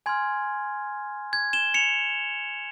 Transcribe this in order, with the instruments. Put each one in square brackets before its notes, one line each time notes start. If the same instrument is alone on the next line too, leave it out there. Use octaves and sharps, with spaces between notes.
[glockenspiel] G#5 C6 F6 G#6
G#6
E7 G7
C#7 F7